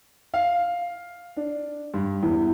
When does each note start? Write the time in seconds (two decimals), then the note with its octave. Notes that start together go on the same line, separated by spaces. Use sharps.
0.34 F5
1.37 D4
1.94 G2
2.23 E2